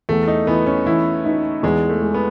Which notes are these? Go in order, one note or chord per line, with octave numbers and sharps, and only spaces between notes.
E2 A3
D#4
E3 B3
C#4
E3 E4
D#4
E2 G#3
A3
G#3
B3